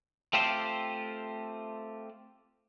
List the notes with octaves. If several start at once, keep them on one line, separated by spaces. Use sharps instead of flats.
A3 C4 F4 G4 A4 C5